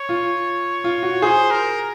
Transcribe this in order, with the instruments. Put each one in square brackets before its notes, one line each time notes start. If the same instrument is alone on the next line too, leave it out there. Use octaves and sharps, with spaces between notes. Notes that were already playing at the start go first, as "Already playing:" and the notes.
Already playing: [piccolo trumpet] C#5
[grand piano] F4
F4
F#4
[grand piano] G#4 [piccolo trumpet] C5
[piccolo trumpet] A#4